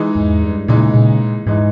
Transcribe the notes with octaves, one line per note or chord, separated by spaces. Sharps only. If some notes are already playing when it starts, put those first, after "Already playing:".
Already playing: E3 G#3 D#4
E2 G#2
G2
A#2 C#3 E3 G#3 D#4
A#2 C#3
G#2 E3 G#3 D#4